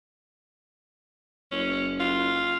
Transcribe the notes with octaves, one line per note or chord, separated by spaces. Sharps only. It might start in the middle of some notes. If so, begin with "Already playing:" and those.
F#1 C#4
F4